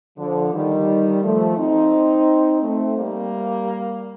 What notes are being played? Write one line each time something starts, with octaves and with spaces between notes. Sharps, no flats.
D3 F3
D#3 G3
F3 A3
C4 D#4
A3 C4
G3 A#3